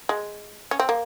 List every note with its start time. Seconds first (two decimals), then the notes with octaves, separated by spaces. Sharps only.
0.09 G#3
0.71 C#4
0.80 C4
0.89 A#3